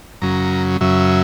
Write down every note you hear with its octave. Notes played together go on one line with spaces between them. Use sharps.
F#2 C#3 F#3 A#5
F#2 C#3 F#3 E5